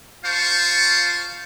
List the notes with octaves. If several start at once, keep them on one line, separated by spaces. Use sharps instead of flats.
F4 C5 F5 A5 C#6